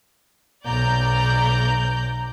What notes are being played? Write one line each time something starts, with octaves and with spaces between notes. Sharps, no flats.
B1 D5 A#5 G6